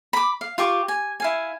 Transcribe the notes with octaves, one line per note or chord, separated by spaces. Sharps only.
B5 D6
F5
F4 G4 C#6 D6
G#5
E4 F5 G#5